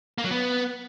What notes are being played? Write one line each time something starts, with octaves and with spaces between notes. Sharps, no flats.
A#3
F#3
B3